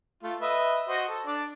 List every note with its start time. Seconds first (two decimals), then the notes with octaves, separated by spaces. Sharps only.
0.23 A3 F4
0.41 B4 D#5 E5
0.88 F#4 C5 D#5
1.09 A4
1.26 D4 D5